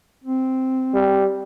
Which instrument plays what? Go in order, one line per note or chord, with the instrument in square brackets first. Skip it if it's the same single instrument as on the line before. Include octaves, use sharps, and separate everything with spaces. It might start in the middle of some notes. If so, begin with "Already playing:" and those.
[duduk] C4
[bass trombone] G3